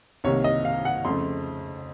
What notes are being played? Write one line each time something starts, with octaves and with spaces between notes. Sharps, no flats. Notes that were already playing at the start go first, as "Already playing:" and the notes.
C2 C3 D#3 A#3 C#5
D#5
F5
F#5
F2 C#3 A3 C6